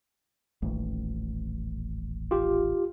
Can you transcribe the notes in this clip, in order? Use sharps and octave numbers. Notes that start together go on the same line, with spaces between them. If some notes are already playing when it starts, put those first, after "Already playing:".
D#1 A1
F4 G4